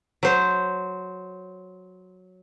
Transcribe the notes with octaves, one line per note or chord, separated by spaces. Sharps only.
F#3 C5